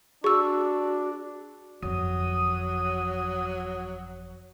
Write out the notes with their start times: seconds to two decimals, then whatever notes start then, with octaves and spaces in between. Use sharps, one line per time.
0.24 D4 F#4 G#4 C#6 E6
1.83 G1 F2 F#3 D#6